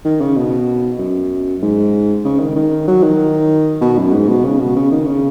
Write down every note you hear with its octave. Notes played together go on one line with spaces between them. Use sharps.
D#3
C#3
B2
F#2
G#2
C#3
D#3
D#3
F#3
D#3
B2
F#2
G#2
B2
C#3
B2
C#3
D#3
C#3